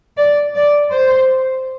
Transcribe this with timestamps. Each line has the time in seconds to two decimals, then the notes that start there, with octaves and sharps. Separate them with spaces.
0.18 D5
0.55 D5
0.90 C5